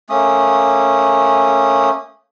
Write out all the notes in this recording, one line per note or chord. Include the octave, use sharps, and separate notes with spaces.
A3 A#3 C#4 D#6